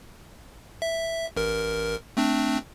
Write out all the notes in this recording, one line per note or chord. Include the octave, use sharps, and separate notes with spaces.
E5
A1 A#4
A3 C4 D4